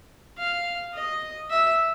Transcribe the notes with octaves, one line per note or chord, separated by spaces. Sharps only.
F5
D#5
E5